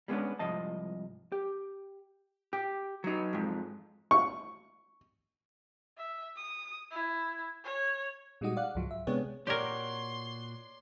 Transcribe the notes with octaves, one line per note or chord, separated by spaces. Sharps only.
G3 G#3 A#3 B3 C#4 D4
C2 G#2 F3 D#5 A5
G4
G4
F#3 D#4
F2 G#2
C#6
E5
D#6
E4
C#5
A#2 G3 G#3 D#4 F#4 D#6
D5 F5 F#5 F#6
C#2 G#2 F3 F#3
E5
C3 G#3 B3 D4 G#4 C#5
A#2 F#4 G4 A#4 C#5 D5 C6 G#6